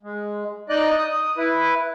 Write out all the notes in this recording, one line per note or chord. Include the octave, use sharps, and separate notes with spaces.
G#3
D#4 D5 D#5 F#6
D#6
E4 B4